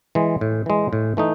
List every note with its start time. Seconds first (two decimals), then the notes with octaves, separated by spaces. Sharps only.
0.15 E3 G#3
0.41 A2
0.66 E3 G#3
0.93 A2
1.17 E3 A3 D#4